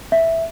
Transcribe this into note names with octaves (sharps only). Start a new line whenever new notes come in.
E5